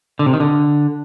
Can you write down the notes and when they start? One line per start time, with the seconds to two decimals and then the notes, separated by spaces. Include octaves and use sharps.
0.19 D3
0.26 C3
0.33 D#3
0.40 D3